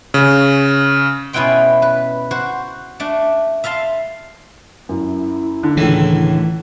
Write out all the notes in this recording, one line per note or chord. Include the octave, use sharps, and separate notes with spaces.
C#3
B2 C#4 E4 F#5 G5 C6
B4
F#4 C5
A3 D4
E5 F5 A5 C6
F#2 E4
D3
C#2 A2 D#3 E3